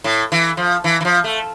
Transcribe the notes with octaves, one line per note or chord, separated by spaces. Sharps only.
A2
E3
F3
E3
E3
F3
A3